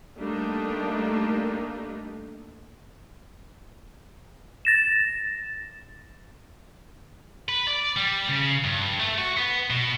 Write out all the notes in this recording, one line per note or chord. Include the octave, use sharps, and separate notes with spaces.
G3 A3 A#3 D4 D#4
A6 A#6 E7
B4
D5
G3
C#3
G2
A3
F#4
B3
B2